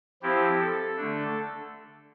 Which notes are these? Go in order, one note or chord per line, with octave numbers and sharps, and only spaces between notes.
F3 C4 E4 G4
A4
D3 A3 D4